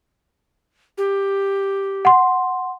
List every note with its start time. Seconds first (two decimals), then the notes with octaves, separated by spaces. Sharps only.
0.98 G4
2.05 F#5 C6